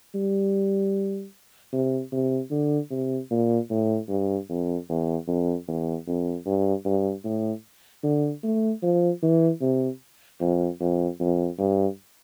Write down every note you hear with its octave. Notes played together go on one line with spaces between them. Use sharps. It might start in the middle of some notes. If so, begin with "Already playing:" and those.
G3
C3
C3
D3
C3
A#2
A2
G2
F2
E2
F2
E2
F2
G2
G2
A2
D3
A3
F3
E3
C3
F2
F2
F2
G2